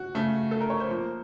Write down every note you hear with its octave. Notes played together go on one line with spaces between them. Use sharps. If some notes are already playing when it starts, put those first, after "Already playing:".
Already playing: F#4
C#3 A3
A4
A#4
C#5
C5
A#2 F3 A#3